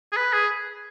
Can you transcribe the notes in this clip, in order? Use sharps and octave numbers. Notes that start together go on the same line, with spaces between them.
G#4
B4
G#4